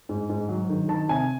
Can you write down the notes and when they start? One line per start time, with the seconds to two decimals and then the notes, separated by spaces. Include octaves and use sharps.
0.09 G#2
0.30 G#2
0.49 F#3
0.70 D#3
0.88 D#3 A5
1.09 C3 G#5